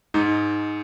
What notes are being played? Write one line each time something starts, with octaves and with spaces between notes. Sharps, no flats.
G#2 D#4